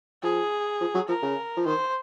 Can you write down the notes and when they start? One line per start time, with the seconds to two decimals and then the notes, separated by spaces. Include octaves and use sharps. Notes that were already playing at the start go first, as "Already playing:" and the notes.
0.23 F3 G#4
0.80 F3
0.94 F#3
1.08 F3 A#4
1.23 C#3
1.57 F3
1.66 D#3 C5